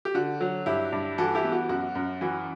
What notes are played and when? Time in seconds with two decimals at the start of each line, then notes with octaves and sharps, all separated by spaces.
0.05 G4
0.14 D3 F#4
0.40 F#3
0.66 G2 E4 G4
0.92 G2
1.18 E3 F#4 A4
1.35 E4 G4
1.44 B3
1.52 F#4
1.69 F#2 F#4
1.95 F#2
2.21 E3 F#4